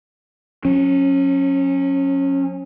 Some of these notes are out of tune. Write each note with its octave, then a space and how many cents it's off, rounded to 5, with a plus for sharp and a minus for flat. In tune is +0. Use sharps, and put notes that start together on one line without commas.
F#3 -40 C#4 -15